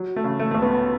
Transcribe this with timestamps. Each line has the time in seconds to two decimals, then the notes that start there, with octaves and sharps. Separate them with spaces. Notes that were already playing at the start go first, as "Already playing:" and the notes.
Already playing: F#3
0.16 A3
0.24 C#3
0.39 A3
0.51 C#2 A3
0.62 B3